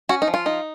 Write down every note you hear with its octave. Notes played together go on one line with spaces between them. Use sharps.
C#4 F#4
D#4
F3
F4
D#4